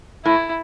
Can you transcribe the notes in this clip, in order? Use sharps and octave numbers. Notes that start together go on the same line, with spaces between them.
A2 E4